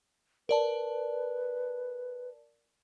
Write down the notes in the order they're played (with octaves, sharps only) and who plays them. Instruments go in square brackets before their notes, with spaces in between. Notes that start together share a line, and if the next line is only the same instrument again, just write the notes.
[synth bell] A#4 D5 A5 [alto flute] B4